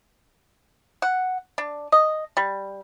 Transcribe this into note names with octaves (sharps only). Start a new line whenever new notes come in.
F#5
D4
D#5
G3